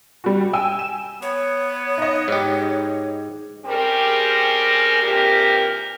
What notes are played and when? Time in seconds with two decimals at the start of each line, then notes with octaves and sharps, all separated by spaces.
0.24 G3 F#4
0.53 G5 G#5 E6
0.79 E7
1.22 B3 C#5
1.98 D#4 D#5
2.28 G#2 G4
3.66 G3 C4 C#4 G4 G#4 A#4
5.03 G2 A#2 E3 C4 G4 A#4